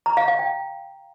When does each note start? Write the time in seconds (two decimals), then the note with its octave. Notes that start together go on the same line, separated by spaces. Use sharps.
0.06 A#5
0.17 F5
0.28 F5
0.39 G5